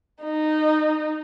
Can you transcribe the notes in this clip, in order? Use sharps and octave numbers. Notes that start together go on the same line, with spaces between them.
D#4